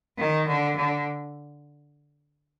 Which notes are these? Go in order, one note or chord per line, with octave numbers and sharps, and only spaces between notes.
D#3
D3
D3